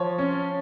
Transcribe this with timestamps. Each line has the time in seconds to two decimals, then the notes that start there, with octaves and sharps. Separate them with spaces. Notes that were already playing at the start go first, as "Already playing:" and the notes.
Already playing: F3 C#5
0.19 C#4